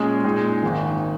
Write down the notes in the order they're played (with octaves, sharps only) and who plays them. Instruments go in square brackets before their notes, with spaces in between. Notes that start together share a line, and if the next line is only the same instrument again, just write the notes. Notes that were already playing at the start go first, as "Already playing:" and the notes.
Already playing: [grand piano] A#2 G#3 C#4 G#4
A#2 G#3 D#4 G#4
G#1 G#2 D#3